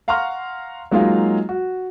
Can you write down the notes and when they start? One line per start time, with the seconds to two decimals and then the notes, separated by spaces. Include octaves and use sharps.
0.08 F5 F#5 A#5 C6 C#6 F6
0.91 F#3 G#3 A#3 D#4 F4 F5
1.49 F#4